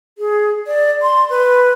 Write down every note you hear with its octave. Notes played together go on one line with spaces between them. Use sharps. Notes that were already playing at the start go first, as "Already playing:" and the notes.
G#4
D5
C6
B4